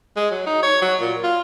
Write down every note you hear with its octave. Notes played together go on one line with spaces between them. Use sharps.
G#3
F#3
D#4
C#5
F#3
A#2
F4